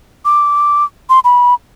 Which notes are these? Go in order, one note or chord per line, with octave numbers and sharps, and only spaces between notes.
D6
C6
B5